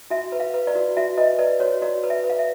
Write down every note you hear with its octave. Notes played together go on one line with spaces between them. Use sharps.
F#4 E5
B4
F5
B4
D5
F#4
F#4 E5
B4 D#5
B4 D5
F#4 C#5
F#4 D5
B4
E5
B4
F5
E5